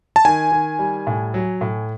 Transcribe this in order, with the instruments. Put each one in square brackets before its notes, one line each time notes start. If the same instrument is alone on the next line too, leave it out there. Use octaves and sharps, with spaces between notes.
[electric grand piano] A5
[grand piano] D#3 [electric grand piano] G#5
[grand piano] D#3
G3
A2
F#3
A2